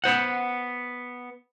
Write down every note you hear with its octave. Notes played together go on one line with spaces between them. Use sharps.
B3 C5 F#5